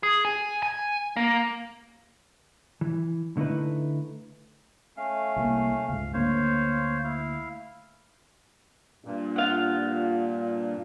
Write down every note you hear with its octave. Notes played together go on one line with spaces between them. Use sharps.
G#4
G#5
G#5
A#3
E3
D3 A3 D#4 E4 B4
A3 C#4 F5
C2 E3 A#3
C#2 G#2 F5
D2 A#3 C5 C#5 F5
E4 F5
G2 A#2
F4 F5 F#5